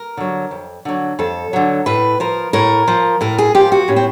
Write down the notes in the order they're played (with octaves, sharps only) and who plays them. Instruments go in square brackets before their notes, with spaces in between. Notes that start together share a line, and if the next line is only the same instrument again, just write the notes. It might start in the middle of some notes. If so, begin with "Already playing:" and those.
Already playing: [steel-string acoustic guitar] A#4
D3 F#3
F2
D3 F#3
F2 A4
D3 F#3
A2 B4
F3 A#4
A2 A#4
F3
A2 A#4
G#4
F3 G4
F#4
A2 C#4
C4